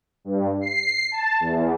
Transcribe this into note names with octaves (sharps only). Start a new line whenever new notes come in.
G2
C7
A5
E2